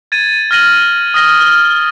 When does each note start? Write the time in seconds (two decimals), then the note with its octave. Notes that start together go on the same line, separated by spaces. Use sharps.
0.12 G#6 A6 D#7
0.51 F6 G#6 A#6 D#7 F#7
1.14 D#6 F6 A#6 G7
1.39 F6